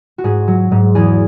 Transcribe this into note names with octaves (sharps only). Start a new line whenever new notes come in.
F#4
G#2 G#4
F#3
G#2
E2 G#4